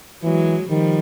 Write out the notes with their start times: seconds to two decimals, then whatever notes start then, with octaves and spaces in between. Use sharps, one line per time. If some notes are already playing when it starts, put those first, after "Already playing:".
0.23 E3 F#3 G#3
0.69 D#3 F3 G3